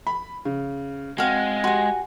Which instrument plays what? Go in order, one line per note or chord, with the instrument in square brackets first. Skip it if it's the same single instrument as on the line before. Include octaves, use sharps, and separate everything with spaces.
[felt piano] B5
C#3
[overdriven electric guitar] G#3 [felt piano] C4 [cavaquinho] F#4 F5
[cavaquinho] F#4 G#5 [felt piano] G4 C6